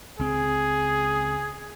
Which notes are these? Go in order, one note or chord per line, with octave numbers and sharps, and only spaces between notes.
C#2 C4 G#4